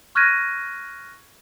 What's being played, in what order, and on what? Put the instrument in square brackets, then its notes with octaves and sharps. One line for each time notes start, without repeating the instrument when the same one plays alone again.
[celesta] C#6 F6 F#6 G#6 A#6 D#7